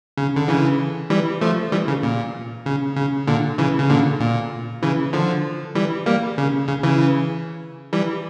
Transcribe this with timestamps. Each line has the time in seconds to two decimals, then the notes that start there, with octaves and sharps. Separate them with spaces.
0.17 C#3
0.36 D3
0.48 C#3 E3
1.10 E3 G3
1.41 F3 A3
1.72 E3 G3
1.88 C#3
2.03 A#2
2.66 C#3
2.96 C#3
3.27 A#2 D3
3.58 C#3 E3
3.79 C#3
3.90 A#2 D3
4.20 A#2
4.82 C#3 E3
5.13 D3 F3
5.75 E3 G3
6.06 G3 A#3
6.38 C#3
6.68 C#3
6.83 C#3 E3
7.93 E3 G3